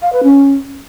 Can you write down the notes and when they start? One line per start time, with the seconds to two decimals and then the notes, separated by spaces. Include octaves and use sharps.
0.02 F5
0.13 B4
0.23 C#4